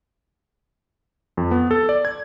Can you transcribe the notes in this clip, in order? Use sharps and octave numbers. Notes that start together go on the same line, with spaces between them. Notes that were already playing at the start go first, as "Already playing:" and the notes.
F2
B3
A4
D5
G#6